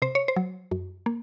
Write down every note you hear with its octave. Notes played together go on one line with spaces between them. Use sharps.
C3 C5
C#5
C5
F#3
F#2
A#3